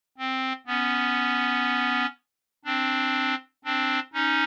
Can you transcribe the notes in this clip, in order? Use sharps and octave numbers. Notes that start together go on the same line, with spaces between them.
C4
B3 C#4
C4 D4
C4 D4
C#4 D#4